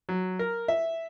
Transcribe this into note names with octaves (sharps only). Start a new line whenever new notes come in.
F#3
A#4
E5